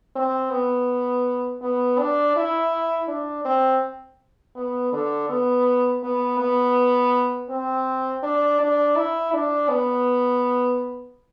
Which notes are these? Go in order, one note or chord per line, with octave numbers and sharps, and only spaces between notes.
C4
B3
B3
D4
E4
D4
C4
B3
D3
B3
B3
B3
C4
D4
D4
E4
D4
B3